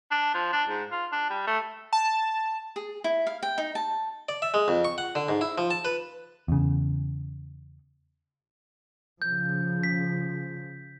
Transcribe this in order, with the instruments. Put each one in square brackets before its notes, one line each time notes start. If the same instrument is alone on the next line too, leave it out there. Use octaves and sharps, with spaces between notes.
[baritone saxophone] D4
F3
D4
G#2
F4
D4
G3
A3
[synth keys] A5
[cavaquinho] G#4
E4
F5
G5
D#4
A5
[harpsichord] D5
E5
G#3
F2
C#6
F#5
D3
G#2
E4
F3
A5
B4
[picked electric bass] E2 C#3
[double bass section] C#3 F3 [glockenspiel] G6
[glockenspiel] B6